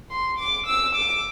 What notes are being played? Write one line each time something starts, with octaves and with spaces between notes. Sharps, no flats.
C6
D6
E6
D6